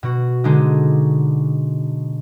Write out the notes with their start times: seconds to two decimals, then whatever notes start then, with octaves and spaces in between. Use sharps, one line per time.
0.03 B2 F#4
0.44 D3 G#3 D4 D#4